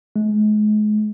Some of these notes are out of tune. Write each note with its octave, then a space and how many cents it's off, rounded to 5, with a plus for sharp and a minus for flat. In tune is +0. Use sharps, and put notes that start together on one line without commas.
G#3 +35